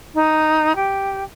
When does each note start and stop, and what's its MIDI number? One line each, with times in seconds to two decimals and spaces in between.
0.14 0.72 63
0.75 1.23 67